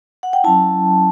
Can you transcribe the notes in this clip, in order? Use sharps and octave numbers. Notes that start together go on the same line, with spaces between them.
F#5
G5
F#3 C#4 E4 A5